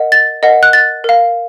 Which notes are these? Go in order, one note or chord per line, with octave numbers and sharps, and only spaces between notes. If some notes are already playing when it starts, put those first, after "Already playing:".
Already playing: A#4 D#5 F#5
A6
A#4 D#5 F#5
F#6
A6
A#4 F5